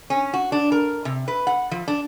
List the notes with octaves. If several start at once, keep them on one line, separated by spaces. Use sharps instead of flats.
C#4
F#4
D4
A#4
C3
B4
F#5
F3
D4